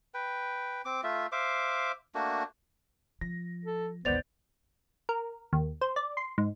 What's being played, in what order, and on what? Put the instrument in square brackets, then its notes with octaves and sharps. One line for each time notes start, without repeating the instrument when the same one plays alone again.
[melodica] B4 G5
C4 D6
A3 F4 E5
C5 E5 F5 D6
A3 A#3 D4 F#4
[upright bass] F3 [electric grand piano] A#6
[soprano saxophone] A4
[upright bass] A1 D#2 [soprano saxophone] B3 [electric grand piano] C5 D5 G6 [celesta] A6 F7
[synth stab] A#4
D#2
C5
D5
C6
G#2